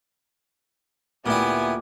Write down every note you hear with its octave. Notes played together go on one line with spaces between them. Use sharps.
D2 A#2 B3 E4 G4 G#5 A5 D6